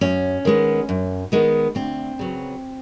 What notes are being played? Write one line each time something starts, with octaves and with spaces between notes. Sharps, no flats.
F#2 C#4
D#3 G#3 B3
F#2
D#3 G#3 B3
D2 C4
C#3 F#3 B3